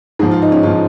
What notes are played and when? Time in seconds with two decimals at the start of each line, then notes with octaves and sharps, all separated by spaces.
0.19 G#2 G#4
0.23 F3
0.31 F4
0.42 D#4
0.52 C#4
0.63 G#2 F3 F4